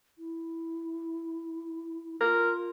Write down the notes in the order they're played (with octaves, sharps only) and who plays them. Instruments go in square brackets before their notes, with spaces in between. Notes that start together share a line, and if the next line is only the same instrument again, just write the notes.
[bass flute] E4
[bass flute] F4 [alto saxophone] A#4